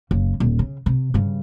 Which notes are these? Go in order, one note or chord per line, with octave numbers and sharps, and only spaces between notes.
F#1 C#3
D#1
C#3
C3
G2 C#3